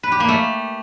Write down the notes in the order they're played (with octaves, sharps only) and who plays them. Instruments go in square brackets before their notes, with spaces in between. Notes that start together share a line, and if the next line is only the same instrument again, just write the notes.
[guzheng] B4
G4
A#3
A3